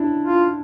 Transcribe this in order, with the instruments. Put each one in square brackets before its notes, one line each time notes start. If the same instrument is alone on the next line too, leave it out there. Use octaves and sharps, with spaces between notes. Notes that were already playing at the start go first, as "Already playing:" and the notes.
Already playing: [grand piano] D4 E4
[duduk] F4